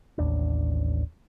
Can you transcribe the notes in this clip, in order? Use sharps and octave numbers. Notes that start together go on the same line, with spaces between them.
A1 D#2 D4